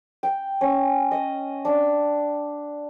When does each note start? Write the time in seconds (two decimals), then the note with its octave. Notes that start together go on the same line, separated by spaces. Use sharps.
0.23 G5
0.61 C#4
1.11 D#5
1.65 D4